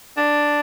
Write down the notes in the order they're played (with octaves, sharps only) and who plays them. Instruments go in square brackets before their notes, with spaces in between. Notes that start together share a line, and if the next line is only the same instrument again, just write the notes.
[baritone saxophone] D4